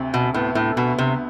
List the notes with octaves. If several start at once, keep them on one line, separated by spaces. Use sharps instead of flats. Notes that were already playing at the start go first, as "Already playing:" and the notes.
Already playing: D2 C3
B2
A2 B3
A2
B2 B3
C3